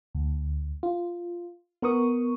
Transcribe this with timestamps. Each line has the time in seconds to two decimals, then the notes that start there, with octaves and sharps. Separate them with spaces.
0.15 D2
0.83 F4
1.82 B3 A#4 C#6 D#6